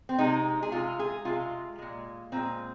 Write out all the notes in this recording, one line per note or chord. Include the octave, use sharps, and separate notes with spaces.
C4
C3 G#3 D#4
G#4
C3 G#3 F4
G#4
C3 G#3 F4
A#2 G#3
A#2 G#3 C4